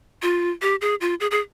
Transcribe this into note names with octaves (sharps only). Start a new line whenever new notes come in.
F4
G4
G#4
F4
G#4
G#4